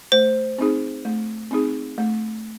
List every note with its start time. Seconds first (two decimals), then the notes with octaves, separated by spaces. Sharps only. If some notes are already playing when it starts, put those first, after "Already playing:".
0.12 A3 C5
0.58 C4 D#4 G#4
1.05 A3
1.51 C4 D#4 G#4
1.98 A3